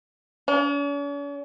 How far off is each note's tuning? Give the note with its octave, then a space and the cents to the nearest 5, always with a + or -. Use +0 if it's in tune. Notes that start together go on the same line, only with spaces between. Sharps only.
C#4 +45